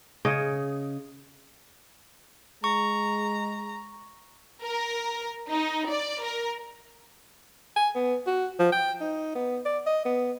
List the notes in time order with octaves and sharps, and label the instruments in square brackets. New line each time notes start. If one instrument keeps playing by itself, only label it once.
[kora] C#3 C#5 D#5
[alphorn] G#3 [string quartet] A#5 [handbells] C#6
[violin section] A#4
D#4
D5
A#4
[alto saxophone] G#5
B3
F#4
F3
G5
D#4
B3
D5
D#5
B3